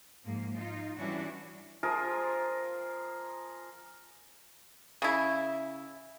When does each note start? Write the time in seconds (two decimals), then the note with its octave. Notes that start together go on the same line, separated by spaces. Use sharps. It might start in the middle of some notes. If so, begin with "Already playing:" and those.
0.24 G#2 F3 A#3
0.55 D#4 F4
0.97 E3 G3 C#4 D4 E4 F#4
1.83 F3 F4 G#4 A#4
5.02 C#3 E4